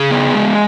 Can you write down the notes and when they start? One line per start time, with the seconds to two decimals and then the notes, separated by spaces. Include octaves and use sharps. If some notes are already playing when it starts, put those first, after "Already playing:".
Already playing: C#3 G#4
0.11 B3
0.35 G#3